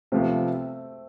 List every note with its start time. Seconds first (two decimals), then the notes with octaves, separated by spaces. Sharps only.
0.12 C3 F3 A3 B3 C4